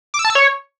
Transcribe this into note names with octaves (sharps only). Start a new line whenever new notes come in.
D6
E6
A5
E6
C#5